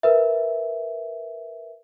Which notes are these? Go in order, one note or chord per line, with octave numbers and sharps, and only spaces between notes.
A#4 B4 E5